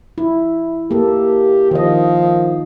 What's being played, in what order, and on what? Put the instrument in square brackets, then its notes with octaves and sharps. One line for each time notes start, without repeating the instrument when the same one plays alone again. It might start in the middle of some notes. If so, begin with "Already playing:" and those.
[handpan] E4
[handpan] A#3 A4 [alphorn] G4
[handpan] D#3 D#5 [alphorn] F3